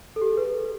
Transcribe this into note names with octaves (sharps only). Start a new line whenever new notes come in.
A4
G4
A4
G#4
B4